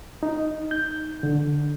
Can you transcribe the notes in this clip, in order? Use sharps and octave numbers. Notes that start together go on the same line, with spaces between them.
D#4
G6
D3